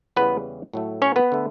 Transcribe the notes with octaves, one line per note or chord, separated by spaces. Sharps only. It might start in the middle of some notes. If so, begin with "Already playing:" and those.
E2 C#3 E3 G3 B3 B4
A2 F#3 A3
C#4 C#5
B3 B4
D3 A3